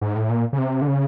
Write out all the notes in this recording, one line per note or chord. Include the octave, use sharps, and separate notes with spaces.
G#2
A2
A#2
C#3
C3
D3
C#3